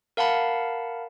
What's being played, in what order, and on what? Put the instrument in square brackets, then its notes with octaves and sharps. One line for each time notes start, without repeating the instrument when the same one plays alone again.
[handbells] A#4 F5 F#5 A5 B5